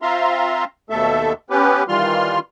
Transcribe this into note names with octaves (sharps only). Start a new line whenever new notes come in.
C4 F4 E5 F5 A#5 C6
D#2 B2 A3 A4 E5
B3 C#4 G4 B4
D#3 E3 G3 F4 C6 F6